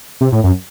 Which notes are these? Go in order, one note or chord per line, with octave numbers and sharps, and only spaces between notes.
C3
A2
F#2